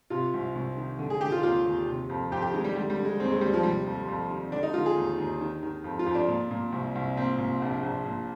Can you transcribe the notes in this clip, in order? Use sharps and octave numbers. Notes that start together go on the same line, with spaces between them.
C3 F4
C2
C2
D#3
D3
G#4
D3 G4
F4
D#2 F4
D#2
C3
F2
F2 G4
G4
D#3 G#3
G3
D3 G3
G3
D3
G#3
D#2 C4
G#3
D#2 G3
F3
C3 G3
F2
F2
D#3
D3 D4
D#4
D3 F4
G#4
D#2
D#2
D#3
D#3
F2
F4
F2
D4
A#2
A#2
C2
C2
A#2 C4
A#2
A#1
A#1
A#2